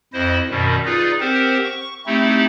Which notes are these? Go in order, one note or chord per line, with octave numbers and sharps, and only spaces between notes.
F2 E4 C5 D#5
F#2 B2 D#3 G3
D#4 F4 G#4 B4 D5
C4 G4 A#4 C5 F#5
C#6
A3 C4 D#4 E4 G4